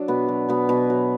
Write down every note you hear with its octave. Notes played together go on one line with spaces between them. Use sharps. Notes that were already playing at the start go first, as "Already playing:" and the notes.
Already playing: F#3 D4
B2 B3
F#3
B2 B3
B2
F#3